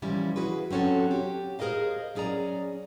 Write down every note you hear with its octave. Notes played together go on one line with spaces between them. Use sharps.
E3 F3 G3 A#3 C#4 E4
F#4 G#4 B4
F#3 C4 C#4 F#4 A4
G4
G#4 A#4 C5 D#5 F5
F#3 C#4 G#4 D5 A#5